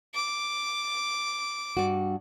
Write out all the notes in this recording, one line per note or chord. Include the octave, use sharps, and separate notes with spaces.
D6
G2 F#4